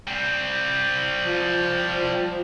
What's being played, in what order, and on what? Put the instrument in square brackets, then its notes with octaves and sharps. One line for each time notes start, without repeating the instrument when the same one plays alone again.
[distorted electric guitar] G3 C4
[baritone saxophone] F3